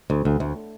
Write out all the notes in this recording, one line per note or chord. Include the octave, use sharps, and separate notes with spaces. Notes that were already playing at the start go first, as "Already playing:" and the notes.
D2
D2
D2